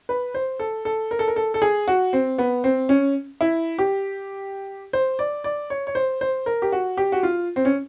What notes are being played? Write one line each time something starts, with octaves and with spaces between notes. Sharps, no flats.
B4
C5
A4
A4
A#4
A4
A#4
A4
A4
G#4
F#4
C4
B3
C4
C#4
E4
G4
C5
D5
D5
C#5
C#5
C5
C5
A#4
G4
F#4
G4
F#4
F4
C4
C#4